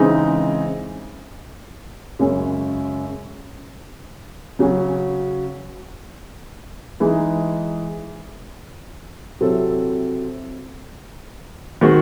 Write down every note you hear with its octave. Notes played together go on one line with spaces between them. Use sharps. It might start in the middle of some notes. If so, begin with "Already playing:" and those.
Already playing: C#3 E3 G#3 C4 D#4
F#2 C#3 G#3 C#4
C#3 F#3 C#4 F#4
E3 G#3 D#4 G#4
C3 F#3 C4 E4 A4
D#3 G#3 C4 F#4